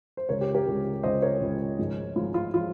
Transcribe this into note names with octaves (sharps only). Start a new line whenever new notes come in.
C5
C#2 C#3 G#3 A#4 C#5
G4
G4 A#4
C#2 C#3 G#3
C#2 C#3 G#3 C5 D#5
A#4 C#5
C#2 C#3 G#3
G#1 G#2 F3 G#3
G#1 G#2 F3 G#3 F4
F4
F3 G#3 F4